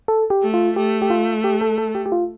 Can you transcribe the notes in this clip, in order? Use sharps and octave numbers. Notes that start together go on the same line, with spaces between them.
A4
G4
A3
F4
A3 G4
G4
F4
G4
A4
A4
G4
G4
F4